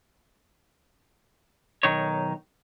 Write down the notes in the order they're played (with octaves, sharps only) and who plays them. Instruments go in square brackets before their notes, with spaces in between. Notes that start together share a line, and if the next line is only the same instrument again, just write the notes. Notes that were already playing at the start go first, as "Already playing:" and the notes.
[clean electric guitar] B1 D#3 D#4 C#5